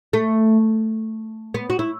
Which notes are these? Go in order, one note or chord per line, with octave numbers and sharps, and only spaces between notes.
A3
B3
F#4
E4